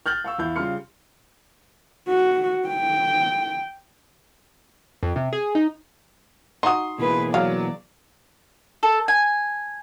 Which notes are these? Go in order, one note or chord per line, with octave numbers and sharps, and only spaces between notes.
F6 G6 A6 F#7
F5 C#6 E6
E2 E4 F5 G6
C#3 G3 F4 C6 F6 C#7
F#4
G5
F2
C3
G#4
D#4
D#4 F#4 C6 D#6
B2 E3 A#3 G#4 B4
F#3 D5 F5
A4
G#5